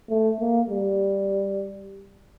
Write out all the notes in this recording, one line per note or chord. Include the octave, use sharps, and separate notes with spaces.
A3
A#3
G3